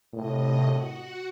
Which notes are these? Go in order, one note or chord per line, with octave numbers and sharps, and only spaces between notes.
A2 C3 D#5
F#4 F#5